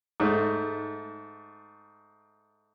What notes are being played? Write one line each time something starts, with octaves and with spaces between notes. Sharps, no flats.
G#2 A3